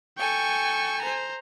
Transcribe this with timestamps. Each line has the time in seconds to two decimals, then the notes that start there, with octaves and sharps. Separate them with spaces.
0.19 A4 G5 G#5 C#6
1.02 C5 A#5